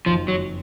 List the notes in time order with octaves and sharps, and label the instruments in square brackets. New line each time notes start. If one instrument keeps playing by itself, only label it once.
[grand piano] F#1 F2 D#3 [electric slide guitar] F3
[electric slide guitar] F#3